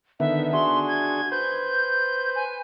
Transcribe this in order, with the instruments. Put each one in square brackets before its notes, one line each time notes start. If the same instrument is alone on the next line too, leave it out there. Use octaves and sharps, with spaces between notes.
[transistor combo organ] D3 D#3 B3 [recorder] E5
[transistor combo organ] D4 F#4 G#4 [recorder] C6
[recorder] G#6
[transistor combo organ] B4 C5 [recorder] G6
[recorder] G#5